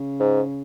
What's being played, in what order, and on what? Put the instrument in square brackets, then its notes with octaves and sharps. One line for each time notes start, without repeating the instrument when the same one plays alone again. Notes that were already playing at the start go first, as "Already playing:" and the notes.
Already playing: [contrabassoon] C#3
[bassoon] G#2